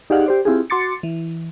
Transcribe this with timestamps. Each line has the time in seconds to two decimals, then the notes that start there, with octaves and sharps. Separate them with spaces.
0.10 D#4 G4 G#4 D5 F5 F#5
0.26 G4 C5 D5
0.45 C4 E4 F4 G4 G#4
0.70 F#4 C6 D6 A6 C#7
1.03 E3